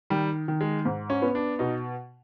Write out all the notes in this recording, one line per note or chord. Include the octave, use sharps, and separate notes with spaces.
D#3 G3
D#3
G#3
G#2
C#4
B3
D4
B2 D#4